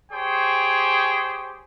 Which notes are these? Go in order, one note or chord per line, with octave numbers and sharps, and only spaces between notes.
G4 G#4 C5 C#5 G5